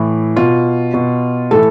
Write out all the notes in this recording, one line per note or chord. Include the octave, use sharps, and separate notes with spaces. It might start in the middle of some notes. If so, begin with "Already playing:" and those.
Already playing: A2 E3
B2 F4
B2
A2 E3 A4